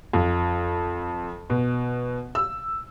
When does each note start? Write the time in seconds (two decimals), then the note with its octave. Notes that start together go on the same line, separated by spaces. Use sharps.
0.13 F2
1.50 B2
2.35 E6